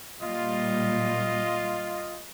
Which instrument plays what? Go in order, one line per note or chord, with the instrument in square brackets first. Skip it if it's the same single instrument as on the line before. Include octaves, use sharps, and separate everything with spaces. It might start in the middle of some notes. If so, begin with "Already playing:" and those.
[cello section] A#2 G3 [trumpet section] F4 D#5